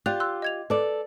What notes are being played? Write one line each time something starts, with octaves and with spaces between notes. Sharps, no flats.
F4 G4 D5 F#6 F7
C6 E6 F#6
D#5 G#6 F7
A4 B4 D5